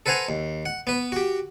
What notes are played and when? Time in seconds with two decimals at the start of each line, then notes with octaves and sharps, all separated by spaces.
0.06 A4 B4 C5 F#5 G#5 A#5
0.29 D#2
0.66 F#5
0.87 B3 B4
1.12 F#4 G4